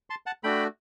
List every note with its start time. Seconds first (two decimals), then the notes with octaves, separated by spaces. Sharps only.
0.10 A5 C6
0.26 F#5 A5
0.44 A3 D4 F#4 G5 B5